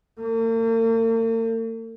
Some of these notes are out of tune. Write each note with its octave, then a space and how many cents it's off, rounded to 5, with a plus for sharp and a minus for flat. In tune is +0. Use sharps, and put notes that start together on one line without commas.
A#3 -45